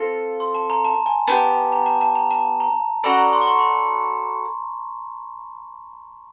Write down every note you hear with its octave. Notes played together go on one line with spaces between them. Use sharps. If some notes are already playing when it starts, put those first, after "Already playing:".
Already playing: C4 F4 A4
C6
A5
A#5
A5
G#5
B3 D4 G4 A5
A#5
A5
A5
A#5
A5
A#5
C#4 F#4 A4 D5 B5
A#5
C6
C#6
C6
B5